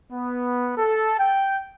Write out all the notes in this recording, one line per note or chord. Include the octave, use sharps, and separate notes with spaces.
B3
A4
G5